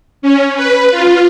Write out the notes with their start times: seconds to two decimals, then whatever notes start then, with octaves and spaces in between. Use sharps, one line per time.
0.22 C#4
0.56 B4
0.91 F4